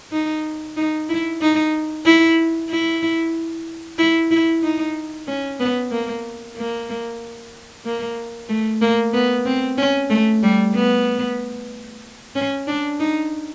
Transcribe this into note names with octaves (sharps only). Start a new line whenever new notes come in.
D#4
D#4
E4
D#4
E4
E4
E4
E4
D#4
C#4
B3
A#3
A#3
A#3
A3
A#3
B3
C4
C#4
A3
G3
B3
C#4
D4
D#4